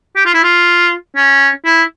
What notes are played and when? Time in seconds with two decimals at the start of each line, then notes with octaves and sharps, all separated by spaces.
0.16 G4
0.25 F4
0.34 E4
0.43 F4
1.16 C#4
1.65 E4